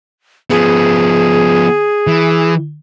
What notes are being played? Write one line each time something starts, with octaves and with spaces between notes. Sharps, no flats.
F3 B3 G#4
E3